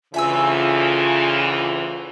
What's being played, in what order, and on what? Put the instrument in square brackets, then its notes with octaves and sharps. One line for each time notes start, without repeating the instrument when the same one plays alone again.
[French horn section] D2 E3 [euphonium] C#3 [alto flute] F4 [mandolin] E5 G#5 E6